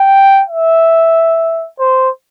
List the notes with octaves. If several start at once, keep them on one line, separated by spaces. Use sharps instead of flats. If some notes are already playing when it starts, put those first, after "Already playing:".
Already playing: G5
E5
C5